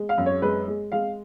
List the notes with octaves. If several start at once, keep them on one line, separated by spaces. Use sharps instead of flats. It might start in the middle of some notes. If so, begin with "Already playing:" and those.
Already playing: G#3
F5
F#2
C#5
G#3 B4
G#3
G#3 F5